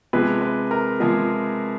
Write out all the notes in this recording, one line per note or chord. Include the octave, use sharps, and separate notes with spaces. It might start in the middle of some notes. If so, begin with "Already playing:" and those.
C3 F3 G#3 B4
B4
A#4
C3 F3 G#3 G#4